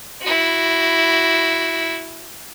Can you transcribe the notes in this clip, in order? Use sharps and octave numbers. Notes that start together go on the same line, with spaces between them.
E4 F#4